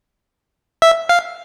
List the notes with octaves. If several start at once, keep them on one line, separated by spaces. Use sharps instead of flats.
E5
F5